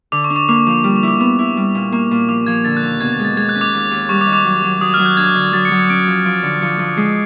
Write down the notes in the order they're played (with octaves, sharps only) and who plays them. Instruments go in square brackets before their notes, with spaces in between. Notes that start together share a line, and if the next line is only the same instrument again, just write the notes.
[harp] D3 [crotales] D6
[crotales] C#6
[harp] D4
[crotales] C#6
[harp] A#3 [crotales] D6
[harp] F3
G3
[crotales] C#6
[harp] E4
[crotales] D6
[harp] B3 [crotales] D6
[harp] E4
G3
A#2
[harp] A#3 [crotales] C#6
[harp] A#2
[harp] F3 [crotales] D6
[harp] F3 [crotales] G#6
[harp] D3 [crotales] A6
[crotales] F#6
[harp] D#2
[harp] B2 [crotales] G#6
[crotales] A6
[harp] G#3
[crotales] A6
[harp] G#3 [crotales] G#6
[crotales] F#6
[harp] C#4
[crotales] D6
[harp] D#2
D#2
[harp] G3 [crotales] C#6
[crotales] D6
[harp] D#3
[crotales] D6
[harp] F#3
F#3
[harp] F#3 [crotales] D#6
[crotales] F6
[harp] F#3
[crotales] F#6
[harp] D4 [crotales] G#6
[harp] D3
[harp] F#3 [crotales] A6
[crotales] C#7
[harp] F#3
[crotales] C#7
[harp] C#4 [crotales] D7
[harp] F3
[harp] F3 [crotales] D7
[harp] D3 [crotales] C#7
[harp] F3 [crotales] C#7
[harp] F3
[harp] G#3 [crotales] C7